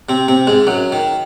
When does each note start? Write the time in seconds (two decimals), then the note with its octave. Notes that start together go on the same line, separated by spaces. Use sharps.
0.09 C3 C4
0.28 C3 C4
0.47 G#2 G#3
0.67 F#2 F#3
0.92 D#3